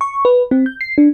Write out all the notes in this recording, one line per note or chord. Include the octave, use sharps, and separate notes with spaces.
C#6
B4
C4
G6
C7
D4